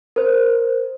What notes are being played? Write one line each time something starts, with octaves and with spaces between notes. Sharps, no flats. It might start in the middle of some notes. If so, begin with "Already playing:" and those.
A#4 C5